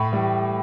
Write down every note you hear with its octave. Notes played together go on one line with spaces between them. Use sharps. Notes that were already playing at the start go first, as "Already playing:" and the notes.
Already playing: A2 B5 C#6
E3 G3